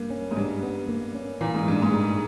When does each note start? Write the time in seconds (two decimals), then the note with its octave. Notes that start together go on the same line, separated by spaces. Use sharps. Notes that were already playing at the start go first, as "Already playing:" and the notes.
Already playing: G2 A#3
0.10 C#4
0.31 G#2
0.36 G2 G3
0.63 B3
0.89 A#3
1.15 C#4
1.41 A#2 E3
1.55 G#2
1.67 G2 G#3
1.82 G#2
1.93 G#3